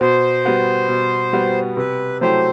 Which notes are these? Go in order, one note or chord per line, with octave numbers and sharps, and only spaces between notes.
B2 C5
G3 B3 F#4
B2
G3 B3 F#4
C3 B4
F#3 A3 E4 G4 C5